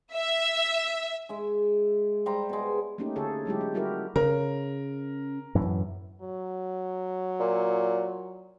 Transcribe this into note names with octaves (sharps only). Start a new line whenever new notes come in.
E5
G#3 E5
G3 C5 E5 A#5
B2 G#3
A3 A#3 C#4 D#4 G4
D3 F4 G#4 A4 C#5
F#3 G#3 E4 G4
C#4
G3 E4 F#4 G4 A#4
C#3 A#4
F#2 A2 E3
F#3
A#2